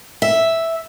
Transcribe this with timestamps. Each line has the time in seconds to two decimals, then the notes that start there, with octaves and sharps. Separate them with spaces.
0.22 E5